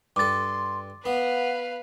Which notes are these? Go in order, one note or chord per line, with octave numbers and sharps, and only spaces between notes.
G2 A4 C6 D6 A6
B3 B4 F5 F#5